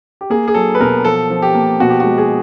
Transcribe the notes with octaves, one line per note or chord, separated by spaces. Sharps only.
G4
A#3 G#4
G#4
F#3 A4
B4
B2 A#4
F3 A4
F3
G4
A#3
B2 F#4
G4
G#3 F#4
G#4